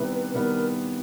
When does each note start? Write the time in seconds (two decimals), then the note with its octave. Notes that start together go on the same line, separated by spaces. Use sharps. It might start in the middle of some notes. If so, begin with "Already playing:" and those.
Already playing: C3 D#3 G3 B3 E4 B4
0.34 C3 D#3 G3 B3 E4 A#4